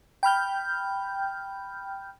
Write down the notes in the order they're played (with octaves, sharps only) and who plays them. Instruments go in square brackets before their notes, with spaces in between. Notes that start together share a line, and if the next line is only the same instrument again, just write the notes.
[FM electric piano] G5 B5 F6 G6